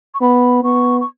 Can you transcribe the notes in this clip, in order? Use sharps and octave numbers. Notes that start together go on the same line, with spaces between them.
C#6
B3 B5
B3 C#6
C#6